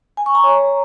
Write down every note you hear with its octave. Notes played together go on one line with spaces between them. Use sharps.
G#5
C#6
A#5
C#5